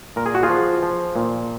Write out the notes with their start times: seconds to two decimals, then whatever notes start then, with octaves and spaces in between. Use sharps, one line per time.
0.16 A#2 A#4
0.26 G#4
0.35 F#4
0.43 F4 G#4
0.50 F3
0.83 F3
1.16 A#2